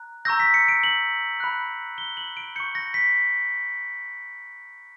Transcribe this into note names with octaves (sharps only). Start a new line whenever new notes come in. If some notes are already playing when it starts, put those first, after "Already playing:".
Already playing: A#5 F#6
A#5 C#6 E6 G6 A#6
B6
C#7
D7
F#7
B5 F#6
G7
F#7
D7
C#6 G6 C#7
A#6
B6